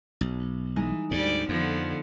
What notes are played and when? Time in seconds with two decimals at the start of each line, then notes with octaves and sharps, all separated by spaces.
0.21 B1
0.76 E3 G#3 D#4 D#5
1.11 D2 G#2 G3 D5
1.49 F2 D3 F3 B3